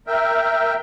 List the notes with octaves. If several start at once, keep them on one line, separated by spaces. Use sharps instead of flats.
A#4 E5 G5